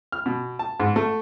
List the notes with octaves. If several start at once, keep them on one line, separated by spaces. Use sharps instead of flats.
F6
B2
A5
G#2
A3